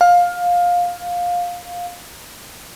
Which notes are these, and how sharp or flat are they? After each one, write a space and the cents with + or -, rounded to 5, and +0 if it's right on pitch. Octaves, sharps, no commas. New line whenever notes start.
F5 +15